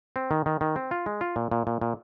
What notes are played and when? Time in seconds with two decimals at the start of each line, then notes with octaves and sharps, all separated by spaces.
0.16 C4
0.31 D#3
0.46 D#3
0.61 D#3
0.76 C4
0.91 F4
1.06 G#3
1.21 F4
1.36 A#2
1.51 A#2
1.67 A#2
1.81 A#2